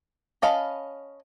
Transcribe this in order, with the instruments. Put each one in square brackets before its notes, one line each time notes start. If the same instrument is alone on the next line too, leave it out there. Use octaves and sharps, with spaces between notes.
[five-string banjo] C#4 D#5 F5 A5 B5